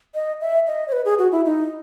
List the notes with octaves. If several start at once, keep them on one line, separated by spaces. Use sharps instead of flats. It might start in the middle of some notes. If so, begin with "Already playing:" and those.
D#5
E5
D#5
C#5
B4
G#4
F#4
E4
D#4